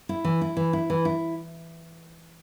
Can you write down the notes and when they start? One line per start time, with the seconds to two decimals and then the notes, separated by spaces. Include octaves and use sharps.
0.09 E4
0.24 E3
0.41 E4
0.57 E3
0.73 E4
0.90 E3
1.05 E4